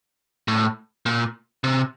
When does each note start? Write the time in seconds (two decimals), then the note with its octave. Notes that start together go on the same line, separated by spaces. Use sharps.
0.48 A2
1.06 A#2
1.64 C3